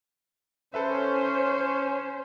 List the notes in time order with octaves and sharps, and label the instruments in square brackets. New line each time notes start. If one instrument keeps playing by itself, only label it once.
[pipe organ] C#4 [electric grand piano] A4 B4 E5 [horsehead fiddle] C5